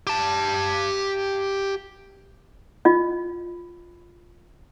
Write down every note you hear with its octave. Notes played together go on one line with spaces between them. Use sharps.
G4 A5
F4 D#5